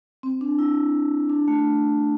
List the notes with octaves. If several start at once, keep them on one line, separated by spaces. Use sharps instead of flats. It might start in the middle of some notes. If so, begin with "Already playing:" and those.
C4
D4
E4
D4
A3